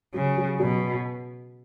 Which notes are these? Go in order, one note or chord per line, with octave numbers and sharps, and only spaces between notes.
C#3 F#3
F#3
B2 F#3